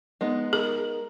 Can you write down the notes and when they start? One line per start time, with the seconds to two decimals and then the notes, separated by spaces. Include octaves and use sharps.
0.21 G#3 B3 D#4
0.53 G#4 A#4